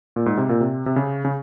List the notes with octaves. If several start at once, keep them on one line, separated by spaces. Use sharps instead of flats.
A#2
G#2
C3
A#2
C3
C3
C#3
C#3